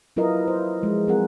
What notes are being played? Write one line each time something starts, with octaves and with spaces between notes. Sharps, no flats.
F#3 E4 F4 A#4 B4 D#5
C5
F3 G#3
F#3 C4 G#4 A#4 F#5